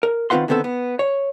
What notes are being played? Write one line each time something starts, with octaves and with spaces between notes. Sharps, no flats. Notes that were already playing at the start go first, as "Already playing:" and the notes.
A#4
D#3 C4 F4 B4 F#5 C6
D3 D#3 B3 C4 A4
B3
C#5